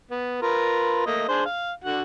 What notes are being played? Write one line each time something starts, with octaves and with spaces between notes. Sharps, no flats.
B3
F4 A#4 B4
A3 A#3 D#5
D4 G#4 C5
F5
D3 F#4 F#5